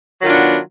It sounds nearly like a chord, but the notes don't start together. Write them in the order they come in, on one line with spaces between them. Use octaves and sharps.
F#3 D#3 F4 D4 B3